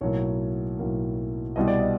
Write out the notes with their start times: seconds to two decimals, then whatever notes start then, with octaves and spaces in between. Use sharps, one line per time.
0.01 B1 A2 F#3 A#3 C#5
0.79 B1 A2 F#3 A#3
1.56 C2 B2 G3 D#5
1.68 D5
1.80 D#5